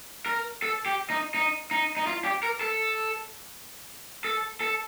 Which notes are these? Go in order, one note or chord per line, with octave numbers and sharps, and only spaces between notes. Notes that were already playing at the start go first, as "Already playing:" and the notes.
A#4
A4
G4
D#4
D#4
D#4
D#4
F4
G4
A#4
A4
A4
A4